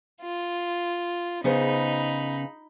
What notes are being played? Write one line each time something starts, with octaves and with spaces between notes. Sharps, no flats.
F4
C#3 B3 D#4 C5 B5